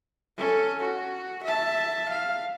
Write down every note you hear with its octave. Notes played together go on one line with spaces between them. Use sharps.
C#4 A4
F#4
E5 A5
F5